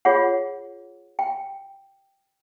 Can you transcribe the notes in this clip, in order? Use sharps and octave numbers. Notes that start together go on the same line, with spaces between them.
F4 G#4 C#5 F#5
G5